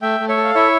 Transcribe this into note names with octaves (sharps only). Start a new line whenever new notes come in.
A3 E5 G5
A3
C#5 E5
A4
F5
E4 C#5 E5